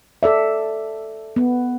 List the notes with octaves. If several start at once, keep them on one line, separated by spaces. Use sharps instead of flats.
A4 D5 E5
B3